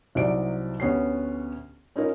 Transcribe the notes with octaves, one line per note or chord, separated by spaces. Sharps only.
C2 C3 F#3 D#4 D5 D7
D2 B3 C#4 G4 C7
C#4 D#4 F4 A#4